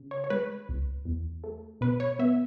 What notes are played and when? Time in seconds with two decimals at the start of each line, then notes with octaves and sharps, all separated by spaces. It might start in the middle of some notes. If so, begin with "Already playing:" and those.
Already playing: C#3
0.11 C#5
0.24 C#5
0.30 G#3 B4
0.69 C#2
1.05 E2
1.44 A3
1.81 B2 B4
2.00 C#5
2.19 B3 E5